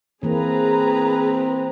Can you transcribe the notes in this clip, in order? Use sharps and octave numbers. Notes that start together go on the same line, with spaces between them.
E3 A#3 C4 G#4 B4 A#5